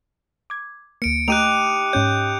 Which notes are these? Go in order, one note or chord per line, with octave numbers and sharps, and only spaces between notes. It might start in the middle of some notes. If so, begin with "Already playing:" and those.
D6 G#6
D2 A#3 C#7 D7
A3 D#4 G4 D#5 F#6 D#7 F7
G#2 C#4 C#5 G6